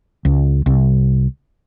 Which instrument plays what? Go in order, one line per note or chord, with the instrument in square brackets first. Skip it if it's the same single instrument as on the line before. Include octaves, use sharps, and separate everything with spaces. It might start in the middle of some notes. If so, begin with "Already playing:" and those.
[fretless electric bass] C#2
C2